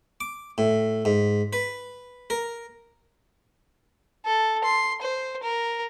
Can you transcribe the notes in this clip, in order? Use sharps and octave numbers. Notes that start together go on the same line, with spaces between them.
D6
A2
G#2
B4
A#4
A4
C6
C5
A#4